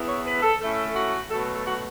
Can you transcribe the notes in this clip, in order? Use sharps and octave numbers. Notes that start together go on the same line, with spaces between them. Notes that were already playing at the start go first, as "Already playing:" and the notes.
Already playing: E2 E3 B3
C#5
B4
A4
A2 A3 C#4 A4
F#4
B2 F#3 A3 A4
A4
F#4